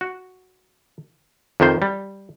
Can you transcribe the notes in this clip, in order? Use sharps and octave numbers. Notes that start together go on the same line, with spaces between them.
F#4
F2 C3 D#3 F3 C5
G3